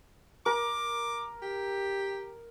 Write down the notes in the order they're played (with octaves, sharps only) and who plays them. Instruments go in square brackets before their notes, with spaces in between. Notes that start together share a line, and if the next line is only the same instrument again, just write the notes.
[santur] A#4 [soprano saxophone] D6
[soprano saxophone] G4